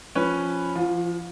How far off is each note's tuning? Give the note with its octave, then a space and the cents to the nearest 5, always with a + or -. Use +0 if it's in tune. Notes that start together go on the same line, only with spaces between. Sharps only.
F3 +0 C#4 +0 B4 +0
F3 -25 F4 +30